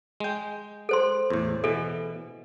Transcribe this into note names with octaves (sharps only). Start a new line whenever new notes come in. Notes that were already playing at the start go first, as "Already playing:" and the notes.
G#3 G5
A4 C5 C6
E2 A2
B2 E3 A4